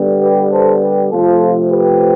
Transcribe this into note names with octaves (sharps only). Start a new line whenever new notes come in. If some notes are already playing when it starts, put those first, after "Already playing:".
Already playing: D3 G3 B3
G4 B4
A4 C5
G4 B4
C3 F3 A3 C4 F4 A4
G4 B4